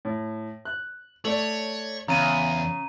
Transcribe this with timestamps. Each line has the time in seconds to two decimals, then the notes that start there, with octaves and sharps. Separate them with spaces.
0.05 A2
0.65 F#6
1.25 A3 C#5 D5 F#7
2.08 E2 C#3 A#5 D#7